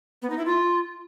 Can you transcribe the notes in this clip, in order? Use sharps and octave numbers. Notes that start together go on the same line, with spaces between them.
B3
D#4
E4
F4